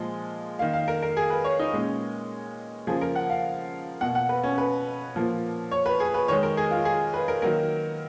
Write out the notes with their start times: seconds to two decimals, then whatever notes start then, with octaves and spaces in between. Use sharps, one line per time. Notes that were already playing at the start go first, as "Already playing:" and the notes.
Already playing: A#2 F3 G#3
0.59 D#3 A#3 F5
0.73 F5
0.88 A#4
1.02 A#4
1.17 G#4
1.30 B4
1.44 C#5
1.59 D#4
1.73 A#2 G#3 C#4
2.87 C#3 F3 A#3 G#4
3.01 A#4
3.15 F#5
3.30 F5
4.00 B2 A#3 F#5
4.15 F#5
4.29 B4
4.44 C#4
4.58 B4
5.15 A#2 F3 A#3
5.71 C#5
5.86 B4
6.00 G#4
6.14 B4
6.28 D#3 G#3 C#5
6.43 A#4
6.57 G#4
6.71 F4
6.85 G#4
7.14 B4
7.28 A#4
7.42 D#3 F#3 A#3 A#4